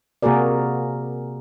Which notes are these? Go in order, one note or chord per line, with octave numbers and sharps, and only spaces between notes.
C3 A#3 F#4 G#4 A#4 D5